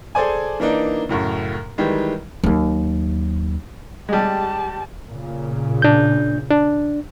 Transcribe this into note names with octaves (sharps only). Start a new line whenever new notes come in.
G#4 A4 C5 D5 G#5
E3 A#3 D4 D#4 A#4
F#2 A2 C#3
D#3 E3 G3 G#3
D#2 F#3
G3 G#3 G4 A5
A#2 C#3
D4 G6
D4